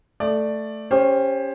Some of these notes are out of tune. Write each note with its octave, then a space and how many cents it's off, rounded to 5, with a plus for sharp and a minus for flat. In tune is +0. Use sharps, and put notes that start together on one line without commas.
A3 +0 D5 +10
C#4 +0 G4 +20 C5 +20